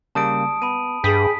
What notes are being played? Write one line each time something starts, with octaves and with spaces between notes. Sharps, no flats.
C#3 G3 A#3 A5 D#6 D7
B3 B5 D#7
G2 G#4 G5 B5 D#6 B6